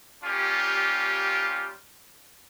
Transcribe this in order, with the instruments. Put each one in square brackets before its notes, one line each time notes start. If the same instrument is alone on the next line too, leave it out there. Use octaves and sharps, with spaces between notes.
[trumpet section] G3 A#3 C#4 F4 G4